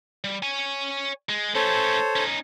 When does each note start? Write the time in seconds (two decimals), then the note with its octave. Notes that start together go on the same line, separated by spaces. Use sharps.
0.24 G3
0.43 C#5 G#5
1.29 G#3
1.55 A3 C#4 A4 C5 C#5
2.16 C#4 D#4